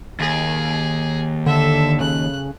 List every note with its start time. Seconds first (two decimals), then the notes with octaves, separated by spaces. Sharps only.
0.20 D#2 G#4
1.46 D3 A4 E5
2.01 C#3 F#6